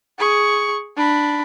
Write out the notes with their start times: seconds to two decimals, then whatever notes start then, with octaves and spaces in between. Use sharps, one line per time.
0.19 G#4 C#6
0.97 D4 B5